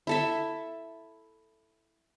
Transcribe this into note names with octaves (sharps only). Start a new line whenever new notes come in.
E4 A4 E5